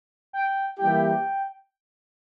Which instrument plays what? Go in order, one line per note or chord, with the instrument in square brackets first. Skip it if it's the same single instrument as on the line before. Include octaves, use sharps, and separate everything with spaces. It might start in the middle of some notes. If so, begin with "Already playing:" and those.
[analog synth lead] G5
[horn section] E3 G3 A#3 E4 G4 [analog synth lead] G5